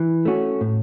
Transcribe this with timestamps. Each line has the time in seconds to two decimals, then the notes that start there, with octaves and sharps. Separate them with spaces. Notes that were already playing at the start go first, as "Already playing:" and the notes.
Already playing: E3
0.25 A3 C#4 F#4
0.61 A2